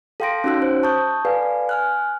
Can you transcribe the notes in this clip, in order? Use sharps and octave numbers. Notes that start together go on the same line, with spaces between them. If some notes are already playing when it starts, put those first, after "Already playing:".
A4 F5 G5 C6 A#6 D7
C#4 D#4 F#4 E6 F#6
C5
A5 C#6 D#6 G6
A4 B4 D5 F5 G#5
G#5 F6 F#6